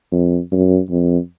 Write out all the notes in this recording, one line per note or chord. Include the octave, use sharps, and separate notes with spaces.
F2
F#2
F2